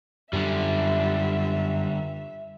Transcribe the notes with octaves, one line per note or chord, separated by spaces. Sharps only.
F#2 D3 G3 E5